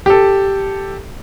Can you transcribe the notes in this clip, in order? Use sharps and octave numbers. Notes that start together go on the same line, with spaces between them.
G4 A4